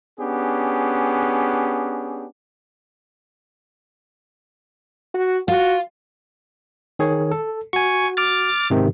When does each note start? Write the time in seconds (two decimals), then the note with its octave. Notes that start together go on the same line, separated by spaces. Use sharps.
0.20 B3 C#4 D4 G4 G#4
5.14 F#4
5.48 F4 F#4
6.99 D#3 G#4 C#5
7.31 A4
7.73 F#4 G#5 C#6
8.17 D6 F6 A6
8.70 G#2 C3 D#3